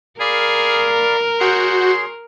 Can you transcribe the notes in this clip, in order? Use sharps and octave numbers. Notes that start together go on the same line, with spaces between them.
G#4 A#4 D5 F5 B5
F#4 G#4 C#5 C6 G6 C#7